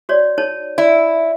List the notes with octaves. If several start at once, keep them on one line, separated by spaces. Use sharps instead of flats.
F#4 C#5 D5
D#4 C#5 A5
E4 D5